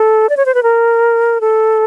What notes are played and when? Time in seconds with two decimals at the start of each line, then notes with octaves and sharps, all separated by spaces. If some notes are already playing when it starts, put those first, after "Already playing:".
Already playing: A4
0.29 D5
0.37 C#5
0.46 C5
0.55 B4
0.63 A#4
1.41 A4